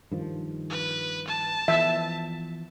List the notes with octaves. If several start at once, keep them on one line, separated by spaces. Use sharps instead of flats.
G2 D#3 F3
B4
A5
E3 F3 B3 E5